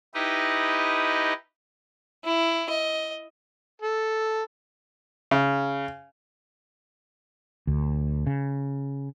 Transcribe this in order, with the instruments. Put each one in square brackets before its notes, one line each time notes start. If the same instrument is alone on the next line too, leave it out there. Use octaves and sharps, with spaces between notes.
[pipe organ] D#4 E4 G4 B4 D#5
[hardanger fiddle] E4
D#5
[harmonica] A4
[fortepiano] C#3
[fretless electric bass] D2
C#3